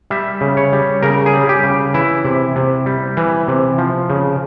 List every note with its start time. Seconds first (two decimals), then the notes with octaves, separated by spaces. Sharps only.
0.10 G3 E5
0.41 C#3
0.57 C#5
0.73 G3
1.02 C#3 A#4
1.26 G#4
1.34 G3
1.49 G4
1.63 C#3
1.94 E3 E4
2.25 C3
2.56 C3
2.86 G3
3.17 E3
3.48 C3
3.78 F3
4.10 C#3